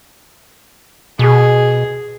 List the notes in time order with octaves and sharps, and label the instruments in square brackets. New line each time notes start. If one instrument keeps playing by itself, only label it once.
[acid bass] B2 [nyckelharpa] G#4